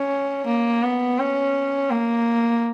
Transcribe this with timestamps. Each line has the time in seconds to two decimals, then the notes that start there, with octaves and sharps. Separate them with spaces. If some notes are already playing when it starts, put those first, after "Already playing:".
Already playing: C#4
0.46 A#3
0.83 B3
1.19 C#4
1.90 A#3